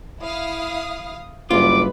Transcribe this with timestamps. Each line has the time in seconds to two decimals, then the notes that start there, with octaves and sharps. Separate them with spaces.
0.20 E4 F5 D#6
1.51 F#1 G2 F4 B4 D6